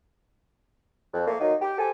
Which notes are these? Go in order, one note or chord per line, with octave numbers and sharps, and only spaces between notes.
F2
A3 A#3
D#3 F#3 A#3 D#4
G4
G4 A4 C5 G#5